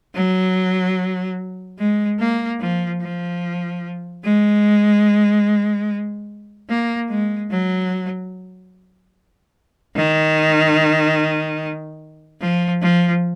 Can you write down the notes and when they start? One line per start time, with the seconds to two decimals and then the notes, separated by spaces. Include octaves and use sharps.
0.15 F#3
1.79 G#3
2.20 A#3
2.60 F3
3.01 F3
4.24 G#3
6.69 A#3
7.10 G#3
7.51 F#3
9.95 D#3
12.41 F3
12.82 F3